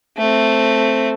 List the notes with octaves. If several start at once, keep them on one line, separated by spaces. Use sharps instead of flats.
A3 C4